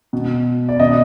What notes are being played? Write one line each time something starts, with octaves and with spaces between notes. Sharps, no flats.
B2
D5
B2 D#5